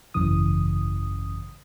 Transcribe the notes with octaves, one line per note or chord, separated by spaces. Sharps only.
G#1 F#2 C#3 E3 D#6